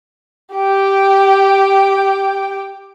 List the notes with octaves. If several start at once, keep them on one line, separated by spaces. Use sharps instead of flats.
G4 G5